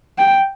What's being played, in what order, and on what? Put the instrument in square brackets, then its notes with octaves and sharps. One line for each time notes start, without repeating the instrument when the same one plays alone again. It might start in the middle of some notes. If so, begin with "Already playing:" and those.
[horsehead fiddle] G5